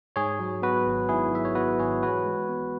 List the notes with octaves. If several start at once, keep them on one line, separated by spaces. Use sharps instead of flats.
G#2 G#4 C#5
F#3
B3 F#4 B4
G#1
G#2 E4 G#4
F#3 E5
C#5
B3 F#4 B4
G#1 G#4 C#5
E3 F#4 B4
G#3
B3